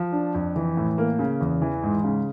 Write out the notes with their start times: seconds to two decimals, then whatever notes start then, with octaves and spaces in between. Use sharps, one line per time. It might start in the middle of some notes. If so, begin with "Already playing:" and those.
Already playing: F3
0.12 D4
0.34 F2
0.56 E3
0.77 A2
0.98 A#3
1.19 C#3
1.41 E2
1.62 E3
1.83 G#2
2.04 C#3